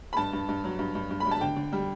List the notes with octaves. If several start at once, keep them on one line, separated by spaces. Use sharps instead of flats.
B5
G2 A5
G2
G2
F#3
G2
G2
G2
B5
G2
A5
D3 G5
D3
G3